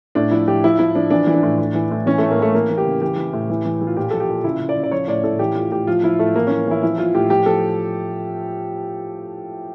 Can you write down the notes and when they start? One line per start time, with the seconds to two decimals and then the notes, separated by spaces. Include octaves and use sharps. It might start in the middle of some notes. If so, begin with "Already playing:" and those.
0.15 A2 D4
0.31 F3 E4
0.48 F3 G4
0.64 F3 E4
0.79 F3 E4
0.95 F3 D4
1.10 E3 D4
1.27 E3
1.34 D4
1.43 A2
1.58 A2
1.74 E3
1.91 A2
2.06 E3 C#4
2.18 A3
2.22 A2
2.31 A#3
2.38 E3 A3
2.54 E3 A#3
2.70 E3
2.78 G4
2.85 C#3
3.02 E3 G4
3.17 E3
3.33 A2
3.50 E3
3.65 E3
3.82 E3
3.87 F4
3.97 A#2 G4
4.11 F3 A4
4.20 G4
4.29 A#2
4.44 C#3 E4
4.60 C#3
4.69 D5
4.77 C#3
4.83 D5
4.91 F3 C#5
5.08 A2 D5
5.24 A2 A4
5.39 E3 G4
5.55 A2 F4
5.72 A2 G4
5.87 F3 F4
6.03 F3 E4
6.19 A2 A3
6.35 E3 A#3
6.47 C#4
6.50 E3
6.66 E3 E4
6.83 F3 E4
6.98 F3 F4
7.14 A2 G4
7.30 F3 G4
7.46 F3 A4